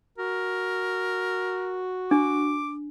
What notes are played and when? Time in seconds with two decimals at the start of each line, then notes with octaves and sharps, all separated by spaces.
0.18 F#4 A#4
2.11 D4 D6